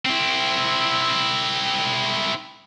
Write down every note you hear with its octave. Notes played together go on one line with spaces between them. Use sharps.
C4 E4